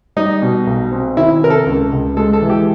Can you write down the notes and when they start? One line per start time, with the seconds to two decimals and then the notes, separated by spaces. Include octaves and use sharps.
0.16 G3 D#4
0.42 B2
0.67 B1
0.92 C4
1.17 D#3 E4
1.42 C3 A#4
1.50 A4
1.66 C#2
1.92 C#2
2.17 G#3 A4
2.33 A4
2.42 E3
2.50 G4